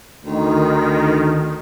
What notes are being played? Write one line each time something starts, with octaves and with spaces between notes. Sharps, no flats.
D2 D#3